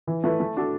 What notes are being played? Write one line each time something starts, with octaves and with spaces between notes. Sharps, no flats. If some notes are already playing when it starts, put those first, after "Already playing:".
E3
A3 E4 B4
A3
D4 F#4 A4